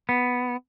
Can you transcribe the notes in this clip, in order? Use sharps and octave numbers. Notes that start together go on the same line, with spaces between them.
B3